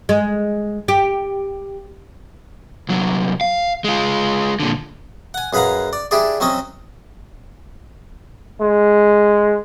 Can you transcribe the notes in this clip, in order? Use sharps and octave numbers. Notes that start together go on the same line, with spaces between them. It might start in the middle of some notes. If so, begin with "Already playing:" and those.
G#3
G4
C2 F#3
F5
G#3 F4
A#2 D3
F#5 G#5
F#2 G#4 B4 F5 F#5 A#5
D5
D4 E4 G4 G#4 D5
F#3 C4 C#4 D#5
G#3